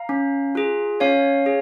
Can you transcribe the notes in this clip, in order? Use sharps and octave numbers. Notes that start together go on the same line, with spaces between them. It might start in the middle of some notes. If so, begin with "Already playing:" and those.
Already playing: F5 A#5
C#4
F4 G#4
C#4 C#5 F5
G#4